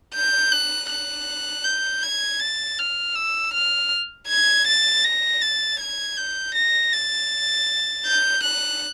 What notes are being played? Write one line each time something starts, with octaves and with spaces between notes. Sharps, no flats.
G6
F#6
F#6
G6
G#6
A6
F6
E6
F6
G#6
A6
A#6
A6
G#6
G6
A#6
A6
G6
F#6